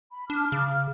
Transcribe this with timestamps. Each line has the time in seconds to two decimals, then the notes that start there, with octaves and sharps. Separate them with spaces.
0.12 B5
0.30 D4 D6 F6
0.52 C#3